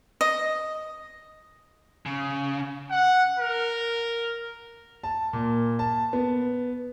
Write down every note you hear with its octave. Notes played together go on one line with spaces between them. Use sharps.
D#5
C#3
F#5
A#4
A5
A#2
A5
B3